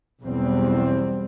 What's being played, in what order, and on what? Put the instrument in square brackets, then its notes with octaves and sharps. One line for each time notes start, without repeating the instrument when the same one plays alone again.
[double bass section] B1 E2 G3 C4